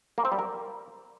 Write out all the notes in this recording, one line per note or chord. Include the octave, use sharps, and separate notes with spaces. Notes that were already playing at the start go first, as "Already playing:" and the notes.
A#3
C4
G3
A#4